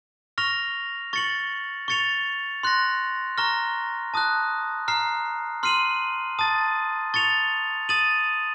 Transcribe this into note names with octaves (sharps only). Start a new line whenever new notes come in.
C#6 F6 A#6 F7
C#6 A6 C#7 F#7
C#6 A6 C#7 F7
C6 F#6 A#6
A#5 C#6 F6 A#6
A5 D#6 F#6
A#5 F6 C7
C6 F6 C7 D#7 F#7
A5 D#6 A6
C#6 A6 C#7 F7
D#6 A6 D#7 F#7